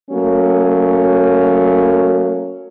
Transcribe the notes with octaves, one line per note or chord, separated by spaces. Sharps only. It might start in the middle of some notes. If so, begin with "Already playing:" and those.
F#3 A3 A#3 C#4